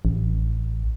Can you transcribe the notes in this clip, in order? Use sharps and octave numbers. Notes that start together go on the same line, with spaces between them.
A1